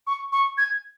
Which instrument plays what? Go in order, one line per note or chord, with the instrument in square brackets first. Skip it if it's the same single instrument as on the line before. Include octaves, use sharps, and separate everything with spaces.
[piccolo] C#6
C#6
G#6